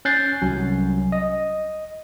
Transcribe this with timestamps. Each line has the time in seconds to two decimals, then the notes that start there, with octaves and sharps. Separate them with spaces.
0.05 C#4 F#6 G6 A6 C7
0.42 C2 F#3 C#4
1.12 D#5